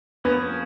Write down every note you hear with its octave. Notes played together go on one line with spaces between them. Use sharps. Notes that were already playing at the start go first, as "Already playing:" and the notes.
F3 A#3 B3 C#4 G#4